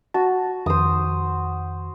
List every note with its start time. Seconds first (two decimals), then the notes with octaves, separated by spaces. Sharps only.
0.14 F#4 A5
0.66 F2 D#3 C5 D#6